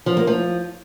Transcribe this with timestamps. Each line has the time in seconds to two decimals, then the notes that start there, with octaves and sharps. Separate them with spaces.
0.06 F3
0.17 A#3
0.27 F3